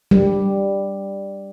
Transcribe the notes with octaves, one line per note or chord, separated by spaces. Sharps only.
G3